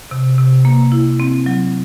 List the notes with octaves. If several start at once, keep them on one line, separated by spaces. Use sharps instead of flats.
C3
C3
A#3
E4
C4
F#3